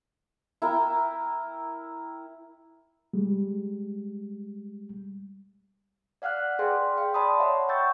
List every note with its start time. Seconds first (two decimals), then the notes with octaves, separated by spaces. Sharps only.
0.62 E4 A#4 G5
3.13 G3 G#3
6.22 D5 F5 F#5 F6 F#6
6.59 G#4 B4 D5 F5 G5 C6
6.97 F5 G5
7.14 D5 A5 B5 C6 D#6
7.40 C#5 D#5 E5 F#5
7.69 G5 C#6 E6 G6 A6